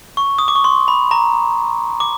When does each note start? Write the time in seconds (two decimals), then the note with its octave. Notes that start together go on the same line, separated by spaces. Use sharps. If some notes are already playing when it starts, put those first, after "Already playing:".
0.17 C#6
0.39 D#6
0.48 D6
0.55 C#6
0.64 C6
0.88 B5
1.11 A#5
2.00 D6